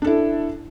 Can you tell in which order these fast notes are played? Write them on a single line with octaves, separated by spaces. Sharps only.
D4 A4 E4